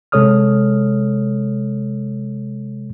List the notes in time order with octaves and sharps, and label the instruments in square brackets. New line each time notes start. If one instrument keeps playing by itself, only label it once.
[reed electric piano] C3 G#3 A4 C#5 D#6 F6